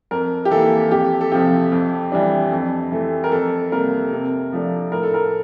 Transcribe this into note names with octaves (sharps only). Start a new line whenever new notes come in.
F2 A#4
G4
E3 A#3 A4
F2 G4
A4
C3 F3 C4 G4
F2
E3 G3 D4
F2
E3 A3
A#4
F2 A4
C3 G3 A#3 A#4
C3
F3 A3 D4
A2 A#4
A4
A#4